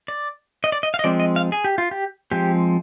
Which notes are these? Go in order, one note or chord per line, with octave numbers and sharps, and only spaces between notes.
D5
D#5
D5
D#5
F5
D#5
F3 G#3 C4 D5
D#5
F5
G#4
G4
F4
G4
F3 G#3 C4 G4